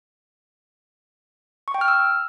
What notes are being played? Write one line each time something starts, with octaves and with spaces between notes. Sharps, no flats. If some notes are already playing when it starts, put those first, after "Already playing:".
C#6
G5
F6
E6